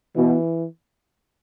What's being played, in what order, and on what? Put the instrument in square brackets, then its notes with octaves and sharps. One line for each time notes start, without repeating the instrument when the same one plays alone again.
[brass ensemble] B2 [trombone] E3